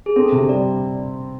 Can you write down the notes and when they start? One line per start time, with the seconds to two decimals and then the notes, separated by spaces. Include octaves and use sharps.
0.06 G#4
0.16 C4 A4
0.32 C3
0.49 G3 D5